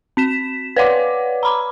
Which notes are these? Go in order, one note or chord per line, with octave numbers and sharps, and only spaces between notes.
C4 B6 E7
B4 C#5 D5 F#5 D6
A#5 B5 D6